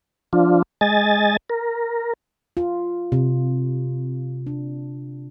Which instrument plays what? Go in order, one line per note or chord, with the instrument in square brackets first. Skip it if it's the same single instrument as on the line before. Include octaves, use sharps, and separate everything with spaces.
[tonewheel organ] F3 D4 F4
G#3 D#5 G#5 A6
A#4
[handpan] F4
C3
D4